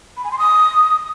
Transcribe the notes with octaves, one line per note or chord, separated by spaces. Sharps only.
B5
G#5
C6
D#6